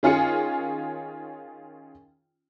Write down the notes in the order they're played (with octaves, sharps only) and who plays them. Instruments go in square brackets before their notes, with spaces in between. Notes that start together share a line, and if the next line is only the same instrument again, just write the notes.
[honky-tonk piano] D#3 C#4 F4 G#4 C#7